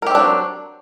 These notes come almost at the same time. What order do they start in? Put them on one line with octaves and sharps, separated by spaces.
A#4 G4 C4 D4 F#3